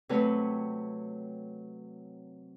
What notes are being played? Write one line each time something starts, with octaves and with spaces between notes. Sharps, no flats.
C3 F#3 A3 B4 C#5